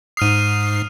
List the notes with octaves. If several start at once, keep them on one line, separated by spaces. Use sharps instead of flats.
G#2 D#6 F6 C7 D#7